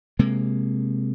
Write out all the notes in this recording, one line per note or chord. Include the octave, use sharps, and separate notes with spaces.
C3 G#3 A#3